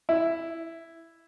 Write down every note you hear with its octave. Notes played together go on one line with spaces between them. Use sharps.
E4